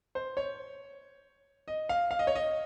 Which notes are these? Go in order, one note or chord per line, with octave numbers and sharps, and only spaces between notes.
C5
C#5
D#5
F5
F5
D#5
C#5
D#5